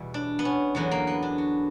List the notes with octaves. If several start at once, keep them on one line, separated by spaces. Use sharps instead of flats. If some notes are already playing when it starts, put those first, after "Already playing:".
Already playing: E2 B2 G3 E4
D4
B3
C#4
E2 D3 F#3 B3
A#3
B3
D4
F#4